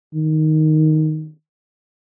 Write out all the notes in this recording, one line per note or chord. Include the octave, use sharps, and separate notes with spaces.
D#3